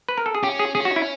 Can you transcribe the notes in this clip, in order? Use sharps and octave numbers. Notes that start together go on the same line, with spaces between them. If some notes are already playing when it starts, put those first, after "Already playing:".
B4
A#4
A4
G#4
C#4 G4
G#4
C#4 G#4
F#4
E4